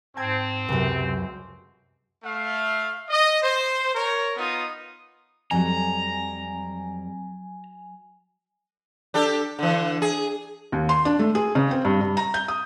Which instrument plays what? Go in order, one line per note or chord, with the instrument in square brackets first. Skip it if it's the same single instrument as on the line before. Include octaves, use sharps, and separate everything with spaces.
[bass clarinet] G#2 [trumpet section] C4 [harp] A5 G#6
[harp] C#2 F#2 [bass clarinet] C3
[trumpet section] A3 F5
D#5
C5
A#4 C#5
B3 D#4 F4 D#6
[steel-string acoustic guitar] F2 G3 [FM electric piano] F#3 G#5 [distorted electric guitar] A#5
[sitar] D4 G4 A4
D3 E3
G#4
[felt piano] D#2
C6
D4
A3
G#4
C#3
C4
G2
G2
A#5
G6
D#6